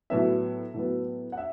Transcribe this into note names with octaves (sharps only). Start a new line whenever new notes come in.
A2 F#3 B3 E5
A2 F#3 B3
F#5
E5